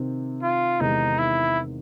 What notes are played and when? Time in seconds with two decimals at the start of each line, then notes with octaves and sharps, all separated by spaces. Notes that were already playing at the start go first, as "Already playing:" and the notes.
Already playing: C3 D#3 C4
0.42 F4
0.80 E2 C3 D#3 G#3 D#4
1.19 E4